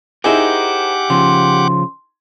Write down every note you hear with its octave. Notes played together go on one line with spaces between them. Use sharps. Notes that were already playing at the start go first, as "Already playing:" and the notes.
D#4 E4 G4 G#4 A#4 C5 F#5 D6
C#3 F3 C6